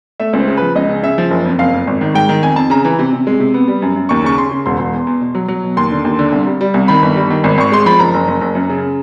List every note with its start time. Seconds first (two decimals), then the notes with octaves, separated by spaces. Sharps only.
0.20 A3 E5
0.33 C#2
0.39 C5
0.48 C#3
0.57 F3 B4
0.75 C#2 D#5
0.89 C#3
1.03 C#3 E5
1.18 F3
1.31 F#1
1.45 F2
1.59 F#1 F5
1.73 F2
1.87 G#1
2.01 D#3
2.15 G#2 G5
2.29 D#3
2.42 F2 G#5
2.56 F2 A5
2.70 C#3 A#5
2.85 E3
2.99 C3
3.13 C3
3.27 G#3
3.40 C3
3.54 B3
3.68 G3
3.82 F#2
3.96 F#2
4.09 D#2 C#6
4.24 C#3 C#6
4.38 C#3 C6
4.51 C#3
4.66 E1 C6
4.79 E1
4.93 E2
5.07 E2
5.21 B2
5.35 F#3
5.48 F#3
5.63 B2
5.77 D#2 C6
5.91 D3
6.05 D#2
6.19 D3
6.32 C2
6.46 G3
6.61 G3
6.74 C2
6.88 D#3 B5
7.02 G1
7.16 G3
7.30 D#3
7.44 G#1
7.58 G#1 C#6
7.72 G#3 C6
7.86 F3 B5
7.99 F#1 A#5
8.14 F#1
8.28 F#1
8.41 F#1
8.55 F#2
8.69 C#3